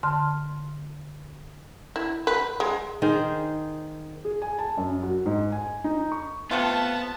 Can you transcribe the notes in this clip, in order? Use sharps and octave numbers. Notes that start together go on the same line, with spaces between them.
D3 A5 C6 F6
E4
B4
G#3
D#3 G#4 C5
G#4
G#5
A5
F#2
F#4
G#2
G#5
D#4
C#6
C3 A3 B3 F4 A5